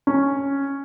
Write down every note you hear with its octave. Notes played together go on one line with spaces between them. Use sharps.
C#4